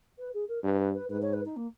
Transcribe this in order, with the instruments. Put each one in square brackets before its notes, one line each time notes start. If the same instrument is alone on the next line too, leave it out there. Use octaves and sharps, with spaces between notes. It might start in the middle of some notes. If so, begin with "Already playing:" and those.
[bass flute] B4
G#4
A#4
[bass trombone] G2 [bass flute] B4
[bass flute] B4
B4
[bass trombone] G#2 [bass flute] B4
[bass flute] C#5
B4
D#4
A#3